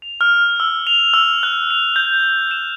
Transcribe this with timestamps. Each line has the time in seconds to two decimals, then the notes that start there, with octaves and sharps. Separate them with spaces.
0.02 F7
0.21 F6
0.60 E6
0.87 F7
1.14 E6
1.43 F#6
1.71 F7
1.96 G6
2.51 E7